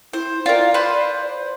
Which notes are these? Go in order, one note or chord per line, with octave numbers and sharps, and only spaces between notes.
E4 C5
F4 A#4 D5
B4 C5 C6